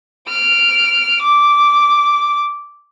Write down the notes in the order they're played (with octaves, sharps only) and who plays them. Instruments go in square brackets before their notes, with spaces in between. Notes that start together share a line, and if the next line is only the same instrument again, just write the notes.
[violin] F6 D7
D6